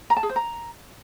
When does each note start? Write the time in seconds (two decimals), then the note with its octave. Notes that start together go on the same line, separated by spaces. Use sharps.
0.10 A#5
0.17 A5
0.23 G#4
0.29 C5
0.36 A#5